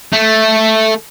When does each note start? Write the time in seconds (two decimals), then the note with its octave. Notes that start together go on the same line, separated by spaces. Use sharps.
0.13 A3